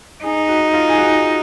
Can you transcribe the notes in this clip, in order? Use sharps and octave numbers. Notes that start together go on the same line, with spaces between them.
D#4 G#4
F#4
F4
G#4
F#4